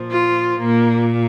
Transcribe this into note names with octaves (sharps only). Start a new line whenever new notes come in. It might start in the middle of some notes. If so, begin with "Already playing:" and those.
Already playing: A#2 F3
F4
A#2 A#3